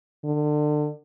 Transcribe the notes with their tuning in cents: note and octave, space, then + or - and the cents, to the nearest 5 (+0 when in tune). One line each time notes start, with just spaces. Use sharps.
D3 +30